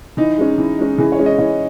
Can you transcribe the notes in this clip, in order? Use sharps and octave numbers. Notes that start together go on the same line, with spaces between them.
E3 D#4
G#3 C#4
E3
G#3 C#4
E3 G#4
C#5
G#3 C#4
D#5
E3 C#5